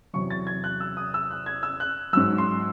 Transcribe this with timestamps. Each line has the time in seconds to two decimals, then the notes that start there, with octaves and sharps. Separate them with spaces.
0.13 E2 C3 F#3 C#6
0.30 A6
0.47 G#6
0.64 F#6
0.80 E6
0.97 D#6
1.14 E6
1.31 F#6
1.46 G#6
1.63 E6
1.80 F#6
2.13 G#2 F#3 E6
2.38 C6